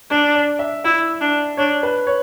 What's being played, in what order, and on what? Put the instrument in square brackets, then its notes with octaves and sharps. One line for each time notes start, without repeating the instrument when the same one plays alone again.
[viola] D4 [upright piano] D5
[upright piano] D5
E5
[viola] E4 [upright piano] E5
[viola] D4
[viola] D4 [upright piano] C#5
[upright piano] B4
C#5